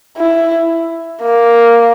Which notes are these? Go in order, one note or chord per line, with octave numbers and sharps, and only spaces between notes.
E4
A#3